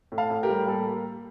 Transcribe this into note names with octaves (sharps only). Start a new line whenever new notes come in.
A2
F5 A5
A2
G4 A#4
G3
A#3 A4